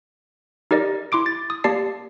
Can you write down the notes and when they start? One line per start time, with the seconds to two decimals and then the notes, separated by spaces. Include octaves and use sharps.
0.71 D#4 G4 A#4 D5 D#5
1.12 E4 C6 D6 D7
1.26 A6
1.50 D#6
1.64 A#3 G4 D5 A5 C7